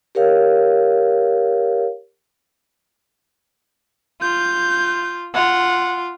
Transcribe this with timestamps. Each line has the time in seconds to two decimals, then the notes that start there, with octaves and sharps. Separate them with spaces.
0.15 G4 A#4 C#5 F5
4.21 F4 G6
5.34 F4 F#5